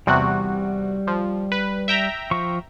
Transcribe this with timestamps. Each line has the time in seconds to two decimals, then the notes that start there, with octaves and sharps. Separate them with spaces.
0.07 E2 C3 G3 F#4 F#6
1.07 F3
1.52 B4
1.88 E5 G5 A#5
2.31 F3 C#6